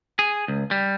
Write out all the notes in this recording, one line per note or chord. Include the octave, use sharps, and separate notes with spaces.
G#4
C#2
G3